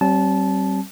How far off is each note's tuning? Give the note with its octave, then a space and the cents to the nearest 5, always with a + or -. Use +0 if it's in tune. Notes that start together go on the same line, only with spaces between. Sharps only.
G3 -35 C4 +30 A5 -20